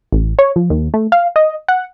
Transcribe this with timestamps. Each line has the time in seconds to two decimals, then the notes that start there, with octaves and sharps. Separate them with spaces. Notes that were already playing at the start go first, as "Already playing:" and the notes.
0.12 A1
0.39 C#5
0.56 F3
0.70 D#2
0.94 A3
1.12 F5
1.36 D#5
1.68 F#5